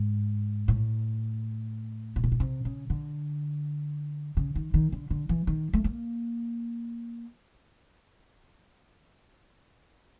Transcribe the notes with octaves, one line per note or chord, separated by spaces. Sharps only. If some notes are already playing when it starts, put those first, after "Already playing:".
Already playing: G#2
A2
A#2
B2
A#2
C3
C#3
D3
C#3
D#3
D#3
D3
D3
E3
D#3
A3
A#3